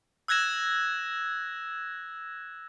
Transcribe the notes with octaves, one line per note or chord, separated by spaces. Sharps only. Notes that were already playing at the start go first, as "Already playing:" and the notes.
E6 F#6 G#6 A#6 E7